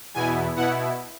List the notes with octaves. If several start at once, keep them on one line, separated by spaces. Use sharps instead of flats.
E2 B2 B3 E4 G#5
B2 B3 E4 F#5